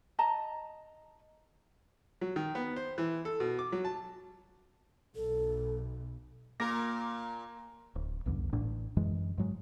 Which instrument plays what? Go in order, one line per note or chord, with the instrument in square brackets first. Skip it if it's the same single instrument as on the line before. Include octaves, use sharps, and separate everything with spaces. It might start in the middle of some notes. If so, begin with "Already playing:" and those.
[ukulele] D#5 A5 A#5
[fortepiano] F#3
D#3
B3
C5
E3
A4
B2
D6
F#3
A5
[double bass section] B1 [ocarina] A4
[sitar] A#2 A#4 [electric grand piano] A#3 D6 A#6
[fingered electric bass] D1
B1 E2 G2 D3
A1 A2 D4
F#2 E3 G#3
G#2 F#3 G#3